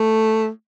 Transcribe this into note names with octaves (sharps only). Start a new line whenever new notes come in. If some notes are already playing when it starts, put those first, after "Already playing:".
Already playing: A3